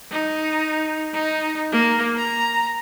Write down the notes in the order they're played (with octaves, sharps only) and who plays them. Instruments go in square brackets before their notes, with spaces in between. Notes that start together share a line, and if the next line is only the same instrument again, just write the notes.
[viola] D#4
D#4
A#3
A#5